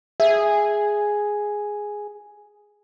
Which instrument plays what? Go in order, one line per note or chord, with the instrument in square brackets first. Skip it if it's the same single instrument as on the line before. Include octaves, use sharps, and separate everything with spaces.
[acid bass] G#4 [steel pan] E5